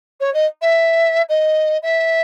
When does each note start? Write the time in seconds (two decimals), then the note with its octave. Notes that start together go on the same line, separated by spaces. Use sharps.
0.20 C#5
0.33 D#5
0.61 E5
1.29 D#5
1.82 E5